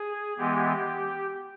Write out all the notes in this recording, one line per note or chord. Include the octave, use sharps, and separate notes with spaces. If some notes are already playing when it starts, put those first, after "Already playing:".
Already playing: G#4
E3 G#3 B3 G4